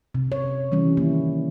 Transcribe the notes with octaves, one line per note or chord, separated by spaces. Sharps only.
C3
C#5
E3 G3 C#4
D#3 A#3 E4